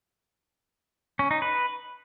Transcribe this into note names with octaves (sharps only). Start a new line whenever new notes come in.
C#4
D#4
B4